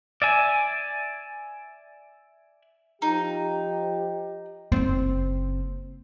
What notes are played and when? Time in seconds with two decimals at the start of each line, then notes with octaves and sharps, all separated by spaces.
0.22 D5 E5 G#5
3.02 F3 D#4 G4
4.72 F#1 C4